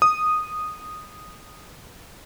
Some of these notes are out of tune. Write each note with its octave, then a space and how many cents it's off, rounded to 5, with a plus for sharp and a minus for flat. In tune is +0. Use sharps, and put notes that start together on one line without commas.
D#6 -10